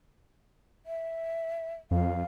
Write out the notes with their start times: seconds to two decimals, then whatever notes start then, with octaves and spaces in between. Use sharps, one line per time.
0.86 E5
1.91 F2 F5